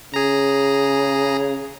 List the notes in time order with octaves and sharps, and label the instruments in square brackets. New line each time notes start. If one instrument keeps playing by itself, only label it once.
[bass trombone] C#3 [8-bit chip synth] G#4 A#5